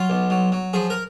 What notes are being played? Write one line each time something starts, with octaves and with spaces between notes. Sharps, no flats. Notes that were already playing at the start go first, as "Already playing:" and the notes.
Already playing: F#3 F4
B1
F#3
F#3
F3 G#4
A#4